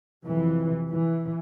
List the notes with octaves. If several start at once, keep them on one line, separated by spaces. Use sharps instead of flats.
F2 C3 E3
E3